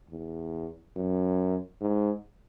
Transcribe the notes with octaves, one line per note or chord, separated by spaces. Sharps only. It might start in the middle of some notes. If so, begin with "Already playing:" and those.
E2
F#2
G#2